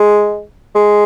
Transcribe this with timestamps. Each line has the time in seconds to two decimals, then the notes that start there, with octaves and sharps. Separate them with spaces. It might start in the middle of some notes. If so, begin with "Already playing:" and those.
Already playing: G#3
0.75 G#3